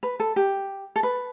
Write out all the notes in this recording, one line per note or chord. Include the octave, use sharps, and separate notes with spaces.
B4
A4
G4
A4
B4